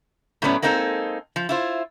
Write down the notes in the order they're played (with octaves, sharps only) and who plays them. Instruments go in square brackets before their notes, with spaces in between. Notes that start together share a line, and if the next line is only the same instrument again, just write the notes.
[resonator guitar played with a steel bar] A2 F#3 A3 B3 C#4 D5
G#3 A#3 C4 D#4 E4 A4
F3
E4 F4 C5